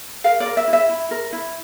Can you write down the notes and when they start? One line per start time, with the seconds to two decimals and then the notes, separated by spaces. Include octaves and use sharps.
0.24 A#4 F5
0.40 D5
0.46 A#4
0.57 E5
0.68 E4
0.73 E5
0.89 E4
1.11 A#4
1.33 E4